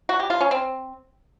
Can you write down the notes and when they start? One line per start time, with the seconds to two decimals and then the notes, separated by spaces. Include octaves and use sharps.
0.09 F#4
0.20 G4
0.30 F4
0.41 C#4
0.51 C4